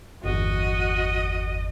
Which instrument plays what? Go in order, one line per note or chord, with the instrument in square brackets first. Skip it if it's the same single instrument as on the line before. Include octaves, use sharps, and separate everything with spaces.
[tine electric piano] G1 E2 [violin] F#4 [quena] D#5